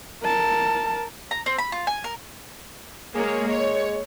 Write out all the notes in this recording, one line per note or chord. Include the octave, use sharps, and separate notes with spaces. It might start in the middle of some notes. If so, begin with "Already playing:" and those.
A#4 A5
A#5
C4
B5
F4
G#5
A#4
G#3 A#3 G#4 C#5
G#3 C#5